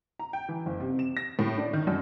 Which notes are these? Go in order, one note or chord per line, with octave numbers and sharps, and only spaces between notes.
A#5
G5
E3
F#1
C3
E7
A#6
A2
D4
D#3
F#2